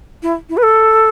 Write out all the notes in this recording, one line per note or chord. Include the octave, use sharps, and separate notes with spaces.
E4
E4
B4
A4